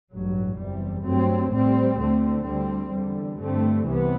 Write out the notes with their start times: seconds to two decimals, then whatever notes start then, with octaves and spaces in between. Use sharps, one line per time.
0.11 A1 G2 F#3
0.57 F#1 E2 C3 G3
1.04 G2 F#3 A3 C4
1.50 A1 A2 G3 C4
1.98 D2 D3 A3 C4
2.44 D2 D3 G3 C4
2.91 E2 D3 G3
3.38 G2 D3 A3 C4
3.84 C2 C3 E3 B3